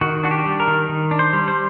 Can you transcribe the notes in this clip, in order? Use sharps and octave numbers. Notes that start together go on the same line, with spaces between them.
D#3 F#4
D4 F#4
G4
G3
A#4
D#3
D#3
D4
C5
G3
C5